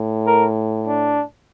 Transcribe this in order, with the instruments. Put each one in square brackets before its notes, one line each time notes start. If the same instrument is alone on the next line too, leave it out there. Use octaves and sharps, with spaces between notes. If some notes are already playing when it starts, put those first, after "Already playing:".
Already playing: [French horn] A2
[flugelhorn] A#4
D4